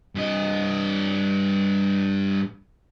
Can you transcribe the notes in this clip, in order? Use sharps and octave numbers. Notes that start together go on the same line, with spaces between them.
G2 D#5